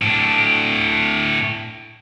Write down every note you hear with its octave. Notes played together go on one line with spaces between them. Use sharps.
A2 D4